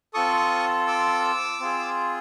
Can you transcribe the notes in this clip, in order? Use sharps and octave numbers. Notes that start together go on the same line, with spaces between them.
C4 F4 A4 C#6 D#6
D6 E6
C4 F4 G#4